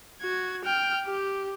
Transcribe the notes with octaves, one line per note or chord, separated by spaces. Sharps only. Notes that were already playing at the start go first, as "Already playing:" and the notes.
F#4 G#6
G5 F6
G4